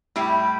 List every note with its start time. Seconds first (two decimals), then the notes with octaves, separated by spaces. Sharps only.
0.16 A2 G3 E4